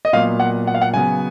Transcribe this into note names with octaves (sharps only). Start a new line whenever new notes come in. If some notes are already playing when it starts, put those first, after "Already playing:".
D#5
A#2 F#3 B3 F5
F#5
F#5
F5
F#5
C#3 F#3 B3 G#5